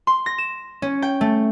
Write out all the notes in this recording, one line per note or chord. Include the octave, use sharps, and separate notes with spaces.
C6
A#6
E7
C#4
G5
A3